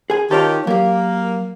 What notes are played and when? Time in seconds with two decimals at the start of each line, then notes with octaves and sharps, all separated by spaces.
0.10 G#4 G#5
0.31 D#3 F4 G4 C#5 A5
0.67 F#3 A#3 G4